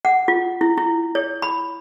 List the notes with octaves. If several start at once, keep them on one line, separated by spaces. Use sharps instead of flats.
F#5
F4
E4
E4
C#5
B5